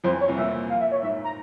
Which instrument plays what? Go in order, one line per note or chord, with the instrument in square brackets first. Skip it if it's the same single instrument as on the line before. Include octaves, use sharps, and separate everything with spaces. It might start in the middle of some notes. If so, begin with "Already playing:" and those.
[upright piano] F2 F3 [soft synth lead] C5
[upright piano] E2 E3
[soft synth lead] C#5
[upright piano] C2 C3
[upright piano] A#1 A#2 [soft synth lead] E5
[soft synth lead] F5
E5
C#5
[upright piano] G#2 [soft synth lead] E5
[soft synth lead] A#5